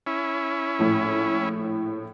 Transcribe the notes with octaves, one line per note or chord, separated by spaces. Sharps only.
C#4 E4
A#1 A2